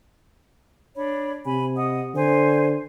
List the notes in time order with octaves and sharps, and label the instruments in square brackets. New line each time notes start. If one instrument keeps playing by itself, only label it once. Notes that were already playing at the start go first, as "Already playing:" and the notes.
[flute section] D4 C#5 B5
[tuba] C3 [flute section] G#5 B5
[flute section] D#5 F#5 D#6
[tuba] D3 [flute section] C5 G#5